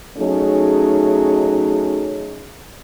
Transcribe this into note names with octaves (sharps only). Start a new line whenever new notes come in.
F#3 A3 C#4 D#4 G#4